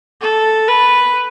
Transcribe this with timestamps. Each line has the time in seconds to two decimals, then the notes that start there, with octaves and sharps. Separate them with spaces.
0.21 A4
0.68 B4